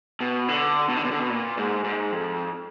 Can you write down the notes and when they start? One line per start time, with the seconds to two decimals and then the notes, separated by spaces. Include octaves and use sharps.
0.21 B2
0.48 D3
0.89 B2
0.97 D3
1.04 B2
1.11 D3
1.20 B2
1.30 A#2
1.57 G#2
1.84 G#2
2.12 F2